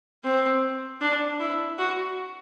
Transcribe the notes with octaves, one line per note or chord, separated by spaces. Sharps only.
C4
D4
E4
F#4